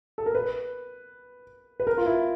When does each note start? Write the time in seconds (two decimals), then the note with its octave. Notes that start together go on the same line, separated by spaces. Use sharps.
0.18 A4
0.26 A#4
0.35 B4
1.80 B4
1.87 A#4
1.98 F4
2.06 E4